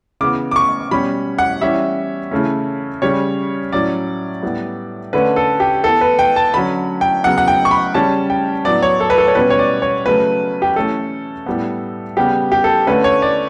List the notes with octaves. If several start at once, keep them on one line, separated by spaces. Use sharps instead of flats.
C#3 E3 B3 D6
D6
C#6
B2 G3 C#4 B5
F#5
E3 G3 C#4 E5
C#3 E3 A3 C#4
C#3 G3 C#4 C#5
A2 F#3 C#4 D5
A2 G3 B3
D3 A3 C#4 B4
A4
G4
E3 B3 A4
B4
G5
A5
D3 F#3 C#4 B5
G5
C#3 F#3 B3 F#5
F#5
G5
C#6
B5
C#3 G3 C#4 A5
G5
A2 F#3 B3 D5
C#5
A4
B4
A4
C#5
B2 G3 C#4 B4
C#5
D5
C#5
C#3 F#3 A3 C#4 B4
G4
E3 A3 C#4 A4
A2 G3 B3
C#3 G3 B3 G4
G4
A4
D3 A3 C#4 B4
C#5
D5